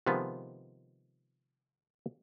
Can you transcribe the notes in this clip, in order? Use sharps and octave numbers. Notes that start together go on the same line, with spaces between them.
C3 D#3 F3 G#3 B3